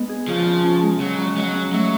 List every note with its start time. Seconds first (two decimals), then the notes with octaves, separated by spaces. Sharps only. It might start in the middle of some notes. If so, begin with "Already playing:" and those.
Already playing: G#3 B3 D4
0.09 G#4
0.28 C#3 F3
0.46 C#3
0.64 C#4
0.83 G#3
1.00 C#3 F#3
1.19 C#3
1.37 F#3 G#3
1.55 C#4
1.73 F#3 A3